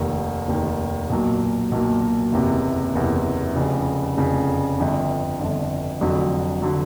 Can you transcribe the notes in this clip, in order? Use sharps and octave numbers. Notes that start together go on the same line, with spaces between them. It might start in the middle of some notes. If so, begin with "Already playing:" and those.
Already playing: F1 D#2 D#3
F1 D#2 D#3
B1 A#2 F#3
B1 A#2 F#3
F#1 E2 C3
F#1 E2 C3
F1 F2 C#3
F1 F2 C#3
G1 F2 D3
G1 F2 D3
F1 F2 D3 F#3
D3 F#3